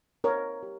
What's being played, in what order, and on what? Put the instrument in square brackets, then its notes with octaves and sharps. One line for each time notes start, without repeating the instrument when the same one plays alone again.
[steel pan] C4 A#4 C#5
G4